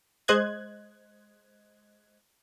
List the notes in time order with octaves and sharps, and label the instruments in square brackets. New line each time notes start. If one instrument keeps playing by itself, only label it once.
[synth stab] G#3 C5 D#5 F#6 G#6